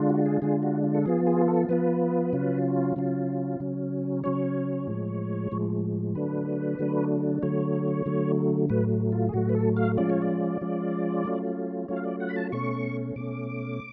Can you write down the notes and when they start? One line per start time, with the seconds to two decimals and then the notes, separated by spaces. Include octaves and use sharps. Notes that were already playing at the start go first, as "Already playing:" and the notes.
Already playing: D3 G#3 D4 F4
0.09 F#4
0.26 G#4
0.42 D3 G#3 D4 F4 G#4
0.63 F#4
0.84 F4
0.95 A4
1.06 F3 B3 F4 G#4
1.27 G#4
1.48 A4
1.69 F3 B3 F4 B4
2.33 C#3 F#3 C#4 F4
2.96 C#3 F#3 C#4 F4
3.60 C#3 F#3 C#4
4.24 C#3 F#3 C#4 C#5
4.87 A2 F3 G#3
5.52 A2 F3 G#3
6.15 D3 F#3 A3 D4 B4
6.79 D3 F#3 A3 D4
7.42 D3 F#3 A3 C#5
8.06 D3 F#3 A3
8.70 A2 F#3 A3 B4
9.12 F4
9.29 G#4
9.34 A2 F#3 A3 F#4
9.49 B4
9.55 A4
9.76 F5
9.97 F3 G#3 C#4 F4 D5
10.09 C#5
10.22 D5
10.61 F3 G#3 C#4 F4
11.24 F#3 A3 C#4 F4
11.88 F#3 A3 C#4 F4 C#5
11.96 F5
12.05 D5
12.20 F#5
12.29 B5
12.36 A5
12.52 B2 A3 C#4 C#6
13.16 B2 A3 C#4 D6